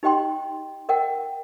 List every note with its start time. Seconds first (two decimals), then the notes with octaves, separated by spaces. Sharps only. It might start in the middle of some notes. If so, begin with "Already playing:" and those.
0.03 D#4 G4 D#5 G5 C6
0.89 A#4 D#5 F#5 G5